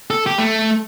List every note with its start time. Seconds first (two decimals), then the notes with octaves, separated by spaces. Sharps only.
0.10 A4
0.26 G4
0.38 A3